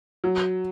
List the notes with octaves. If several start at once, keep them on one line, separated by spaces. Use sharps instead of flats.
F#3